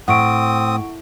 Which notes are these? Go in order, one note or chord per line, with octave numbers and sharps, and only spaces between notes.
A2 C4 F#5 C#6 D#6 D7